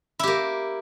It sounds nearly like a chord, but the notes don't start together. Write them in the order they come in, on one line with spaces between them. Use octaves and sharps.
E4 G4 A#3